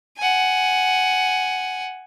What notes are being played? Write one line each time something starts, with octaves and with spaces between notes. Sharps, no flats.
F#5 G#5